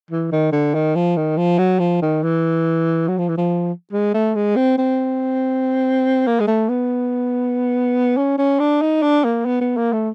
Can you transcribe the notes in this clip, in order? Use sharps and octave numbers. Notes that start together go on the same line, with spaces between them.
E3
D#3
D3
D#3
F3
D#3
F3
F#3
F3
D#3
E3
F#3
F3
E3
F3
G#3
A3
G#3
C4
C4
A#3
G#3
A3
B3
C#4
C#4
D4
D#4
D4
A#3
B3
B3
A#3
A3